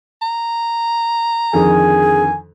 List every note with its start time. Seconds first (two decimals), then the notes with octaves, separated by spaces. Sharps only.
0.22 A#5
1.53 F2 D3 D#3 G#4 G#5